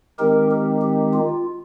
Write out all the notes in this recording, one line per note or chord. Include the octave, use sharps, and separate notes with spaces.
D#3 G#3 C4 D#4 G4 A#4
G4
G4
F4